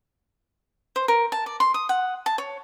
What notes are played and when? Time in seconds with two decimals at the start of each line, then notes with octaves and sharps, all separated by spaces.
0.96 C5
1.08 A#4
1.32 A5
1.46 D5
1.60 C6
1.74 D#6
1.89 F#5
2.26 A5
2.38 C#5